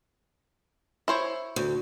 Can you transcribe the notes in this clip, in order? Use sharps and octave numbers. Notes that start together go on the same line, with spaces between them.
E4 C5 C#5
D2